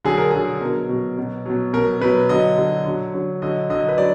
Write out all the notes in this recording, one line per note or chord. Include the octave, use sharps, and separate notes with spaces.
D3 F#3 G#4
A#4
D3 F#3 G#4
B2 F#3 A#4
B2 F#3
B2 F#3
B2 F#3
B2 F#3 A#4
B2 F#3 B4
D3 F#3 D#5
D3 F#3
D3 F#3
D3 F#3
D3 F#3 D#5
D3 F#3 D#5
B4
F#3 D5